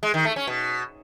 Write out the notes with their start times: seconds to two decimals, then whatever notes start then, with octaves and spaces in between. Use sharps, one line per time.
0.03 G#3
0.14 D#3
0.25 A3
0.36 C#4
0.47 B2